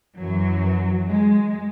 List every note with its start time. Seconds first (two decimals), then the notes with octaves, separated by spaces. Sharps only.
0.17 F#2 E3 F#3
1.08 G#3